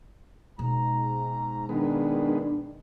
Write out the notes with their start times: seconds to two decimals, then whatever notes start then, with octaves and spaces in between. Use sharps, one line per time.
0.59 G#2 B2 A#5
1.69 D#3 G#3 B3 D4